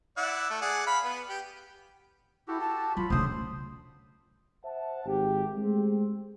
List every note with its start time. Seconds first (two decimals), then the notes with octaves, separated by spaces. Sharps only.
0.17 E4 D5 F#5
0.50 A3
0.61 G#4 D5 F#5
0.87 F5 B5
1.04 B3
1.29 G4
2.48 E4 F#4 G4 A4
2.60 A5
2.97 F#3 F4 B5
3.10 D2 C#3 C5 D#6
4.64 C5 E5 F#5 A5
5.06 G#1 G4
5.58 G#3 A3 C4